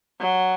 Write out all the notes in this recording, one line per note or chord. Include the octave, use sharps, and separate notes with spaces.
F#3